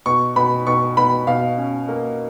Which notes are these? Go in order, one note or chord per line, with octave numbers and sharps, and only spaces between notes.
B2 C#6
B2 B5
B2 C#6
B2 B5
B2 F5
C#4
A#3